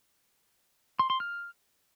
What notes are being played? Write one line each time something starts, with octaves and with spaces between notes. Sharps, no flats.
C6
C6
F6